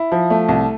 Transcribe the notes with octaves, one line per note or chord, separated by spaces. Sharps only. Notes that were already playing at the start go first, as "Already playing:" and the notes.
Already playing: E4
F3
A3
C2